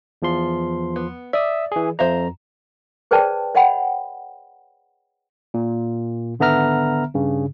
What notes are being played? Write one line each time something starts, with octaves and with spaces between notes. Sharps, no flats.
E2 F3 C6
B3
D5 E5 D#6
E3 G#4
F2 C5 E5 F5 A#5
G#4 B4 C5 D5 G5 A5
C#5 D#5 F#5 G5 B5
A#2
G#1 D3 B3 E5 A#5 F6
G2 C#3